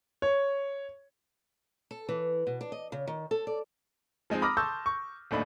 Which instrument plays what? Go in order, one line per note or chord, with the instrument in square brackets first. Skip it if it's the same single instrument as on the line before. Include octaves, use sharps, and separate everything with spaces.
[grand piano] C#5
[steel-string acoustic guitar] A4
E3
B2
D4
D#5
C#3
D#3
A4
D5
[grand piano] F3 G#3 C4 D#4
A#5 B5 D6 D#6 F6 A#6
A5 C6 C#6 E6 G6
C#6
D1 D#2 A3 D4 D#4 B5